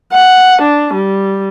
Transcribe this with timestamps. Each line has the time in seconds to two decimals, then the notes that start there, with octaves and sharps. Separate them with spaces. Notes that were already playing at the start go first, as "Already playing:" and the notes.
0.13 F#5
0.62 D4
0.94 G3